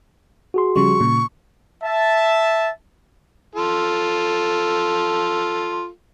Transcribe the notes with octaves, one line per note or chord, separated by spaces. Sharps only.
F#4 G#4 C6
C#3 F3 G3 C#6
A#2 C#3
E5 A5
F4 A4